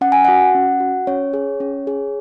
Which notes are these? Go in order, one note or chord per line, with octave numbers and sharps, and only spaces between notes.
C#4 F#5
G#5
F#4 F#5
C#4
F#4
C#4 C#5
G#4
C#4
G#4